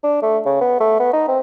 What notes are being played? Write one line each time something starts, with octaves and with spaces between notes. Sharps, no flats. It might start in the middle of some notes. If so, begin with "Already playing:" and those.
D4
A3
C#3
B3
A3
B3
D#4
C4